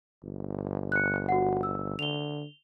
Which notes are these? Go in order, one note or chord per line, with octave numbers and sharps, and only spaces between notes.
G1
F#6 C#7
F#4 F#5
E6
D3 F7 G7